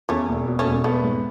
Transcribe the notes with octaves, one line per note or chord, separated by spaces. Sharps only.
E2 A3 C#4
E1
B2
A3 C#4
E1
A3 B3
G#2